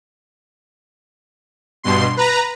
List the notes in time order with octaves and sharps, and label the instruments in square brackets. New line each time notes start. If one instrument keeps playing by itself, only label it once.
[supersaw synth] G2 B2 C6
B4 A#5